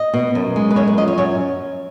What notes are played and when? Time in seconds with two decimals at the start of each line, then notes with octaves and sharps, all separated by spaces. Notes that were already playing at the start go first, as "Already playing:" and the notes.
Already playing: D#5
0.14 B2
0.35 F#2
0.56 G#3
0.71 B4
0.76 F#2 C#5
0.88 B4
0.98 F3 D#5
1.08 C#5
1.18 F#2 C#5